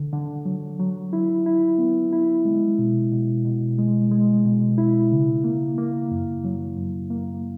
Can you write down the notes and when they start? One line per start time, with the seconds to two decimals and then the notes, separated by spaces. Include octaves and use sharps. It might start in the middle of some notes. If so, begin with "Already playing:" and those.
Already playing: D3
0.13 D3
0.46 F#3
0.79 F#3
1.13 E4
1.46 E4
1.79 B3
2.12 E4
2.45 G#3
2.79 B2
3.12 B2
3.45 B2
3.78 G#3
4.11 G#3
4.45 B2
4.78 E4
5.12 C#3
5.44 A#3
5.78 A#3
6.11 F#2
6.45 F#3
6.77 F#2
7.10 A#3